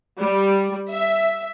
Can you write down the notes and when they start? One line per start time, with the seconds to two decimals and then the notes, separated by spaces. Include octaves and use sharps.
0.21 G3
0.91 E5